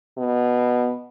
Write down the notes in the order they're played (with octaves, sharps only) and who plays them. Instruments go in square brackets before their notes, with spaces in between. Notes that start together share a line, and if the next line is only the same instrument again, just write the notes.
[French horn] B2